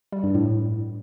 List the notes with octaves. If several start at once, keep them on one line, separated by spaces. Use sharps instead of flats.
G3
G2
A2